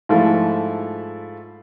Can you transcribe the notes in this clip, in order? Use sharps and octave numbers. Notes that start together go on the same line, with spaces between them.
G#2 F3 A3 E4 F4